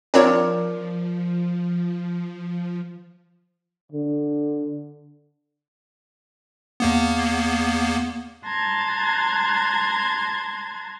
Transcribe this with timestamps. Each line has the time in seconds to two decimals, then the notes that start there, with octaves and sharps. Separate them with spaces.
0.14 F3 C4 D4 F4 A#4 C#5 D5
3.92 D3
6.80 E2 A#3 B3
8.44 A5 A#5 C6 F#6 G#6 A6